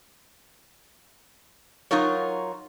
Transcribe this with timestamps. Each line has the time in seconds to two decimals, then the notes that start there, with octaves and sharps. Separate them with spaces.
1.91 F#3 D#4 F4 A#4 C#5